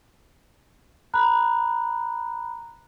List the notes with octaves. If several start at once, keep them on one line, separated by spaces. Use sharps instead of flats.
A#5 B5 F#6